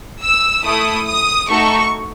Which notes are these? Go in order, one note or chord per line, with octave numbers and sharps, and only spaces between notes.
E6
A3 E4 A4 D#6
D#6
A3 D#4 F#4 A4 C#6